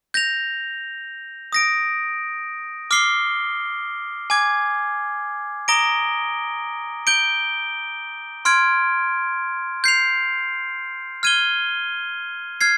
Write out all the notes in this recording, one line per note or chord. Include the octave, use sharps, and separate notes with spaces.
G6 A#6 F7
D#6 A#6 D7
D6 F6 C7 G7
G#5 D6 G#6
A#5 D#6 A#6 D7 G7
G6 D7 G7
C6 F6 G#6 D7
G6 C7 F7
F6 G#6 D#7 G7
F6 G#6 C7